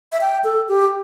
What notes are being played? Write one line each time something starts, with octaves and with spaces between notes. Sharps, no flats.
E5
G5
A4
G4